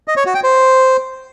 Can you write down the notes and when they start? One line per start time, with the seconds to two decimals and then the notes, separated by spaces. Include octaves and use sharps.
0.08 D#5
0.17 C#5
0.26 F#4
0.35 G5
0.43 C5